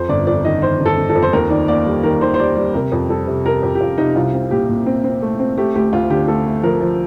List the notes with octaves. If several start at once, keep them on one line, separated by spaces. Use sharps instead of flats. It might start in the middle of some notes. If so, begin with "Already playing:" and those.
Already playing: F2 C5
G1 D5
F2 D5
D#3 D#5
D#3 C5
G1
A4
G1
A4
F2
C5
D#2 A#4
D#3 D5
A#3 D5
G3
D#3 A#4
D#3 C5
C5
G3 D5
G3 D5
C3 A#4
F2
G3 A4
C3
C3 A#4
F2 G4
G4
F2 F4
C3 D#4
C2 F4
C4
A#2 G4
A#2
C4
C4
A3
C4
A3 G4
D2 G4
D2 F4
D3 G4
A3 A4
A3
F3 A#4
F3